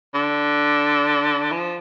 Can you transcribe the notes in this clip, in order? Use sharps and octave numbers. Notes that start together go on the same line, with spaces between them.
D3
F3